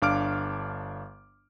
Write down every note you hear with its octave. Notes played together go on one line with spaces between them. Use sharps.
G1 D4 F5 D6 F6 D7